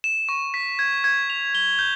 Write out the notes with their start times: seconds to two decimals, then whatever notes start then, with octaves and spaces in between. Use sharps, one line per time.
0.04 E7
0.29 C#6
0.54 B6
0.79 G#6
1.04 G#6
1.30 F7
1.55 G7
1.79 G6